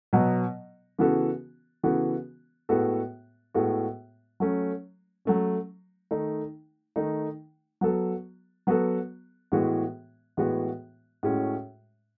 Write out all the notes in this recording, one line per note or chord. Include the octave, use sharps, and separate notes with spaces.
B2 F#3 B3
C#3 E3 B3 F#4 A4
C#3 E3 B3 F#4 A4
A2 G#3 B3 F#4 A4
A2 G#3 B3 F#4 A4
F#3 A3 C#4
F#3 A3 C#4
D#3 A3 D#4
D#3 A3 D#4
F#3 B3 F#4 A4
F#3 B3 F#4 A4
A2 E3 G#3 B3 F#4
A2 E3 G#3 B3 F#4
A2 G#3 C#4 F#4